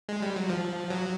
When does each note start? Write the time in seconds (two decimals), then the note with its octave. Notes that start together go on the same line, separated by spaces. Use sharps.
0.09 G#3
0.22 G3
0.36 F#3
0.49 F3
0.90 F#3